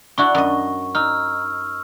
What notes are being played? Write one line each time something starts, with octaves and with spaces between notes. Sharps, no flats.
D4 E4 F#4 C#6
F#2 D#5
D#4 E6 F6